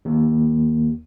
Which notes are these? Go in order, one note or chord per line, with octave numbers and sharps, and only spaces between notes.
D#2